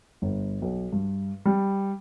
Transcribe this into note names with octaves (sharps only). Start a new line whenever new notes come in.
G1
B1
G2
G3